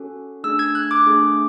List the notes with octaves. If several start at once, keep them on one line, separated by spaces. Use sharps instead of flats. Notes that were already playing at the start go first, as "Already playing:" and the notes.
Already playing: C#4 F#4 A4
A3 D4 G#4 E6
G#6
F#6
D6
A3 D4 G#4